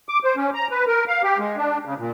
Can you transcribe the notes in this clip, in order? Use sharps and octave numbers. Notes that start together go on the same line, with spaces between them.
D6
C5
C#4
A#5
B4
A#4
F5
G4
G#3
D4
C#3
A#2